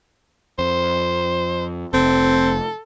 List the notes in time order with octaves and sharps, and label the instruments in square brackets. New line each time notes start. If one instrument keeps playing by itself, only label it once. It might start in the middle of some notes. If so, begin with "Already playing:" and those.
[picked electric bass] F2 [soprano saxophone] C5
[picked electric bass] F1 [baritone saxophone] C4 [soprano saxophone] A4